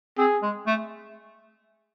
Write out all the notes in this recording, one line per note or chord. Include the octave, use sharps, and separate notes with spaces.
C4 G#4
G#3
A3